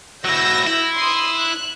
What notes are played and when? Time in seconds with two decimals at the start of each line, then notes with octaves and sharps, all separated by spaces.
0.25 F#3 E4 E6 G6 A#6
0.67 E4
0.96 C6 D#6
1.36 F#6